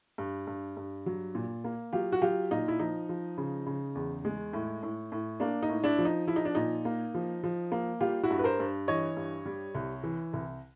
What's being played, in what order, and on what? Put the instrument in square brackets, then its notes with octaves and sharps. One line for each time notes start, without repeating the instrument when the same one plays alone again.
[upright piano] G2
G2
G2
F#3
A#2
A#3
F#3 F4 G4
F#4
F#3 F4 G4
A#2 D#4 F4
E4
F3 D#4
F3
C#3
C#3
E2
G#3
A2
A2
A2
A#3 D4
D#4
A2
D4 E4
F3
D#4
F3 E4
D#4
D4
A#2 D#4
A#3
F3
F3
A#3
G3 F4 G4
E4 F#4
G2
B4
A#4 C5
G2
E3 C#5 D#5
G2
G3
C2
E3
C2